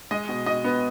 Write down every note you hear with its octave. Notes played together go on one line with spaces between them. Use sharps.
G#3 D#5
B2
B2 D#5
B3